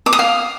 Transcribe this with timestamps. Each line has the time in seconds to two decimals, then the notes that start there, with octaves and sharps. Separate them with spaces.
0.06 D6
0.13 D#6
0.19 F5